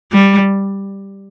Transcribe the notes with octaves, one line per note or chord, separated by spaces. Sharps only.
G3